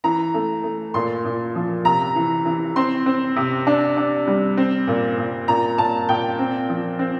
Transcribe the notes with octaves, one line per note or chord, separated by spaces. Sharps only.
E3 A#5
A3
A3
A#2 C6
A#2
F3
C3 A#5
E3
E3
C4 C6
C4
C3
D4
D4
G3
C4
A#2
A#2
A#2 A#5
A#2 A5
A#2 G5
C4
F3
C4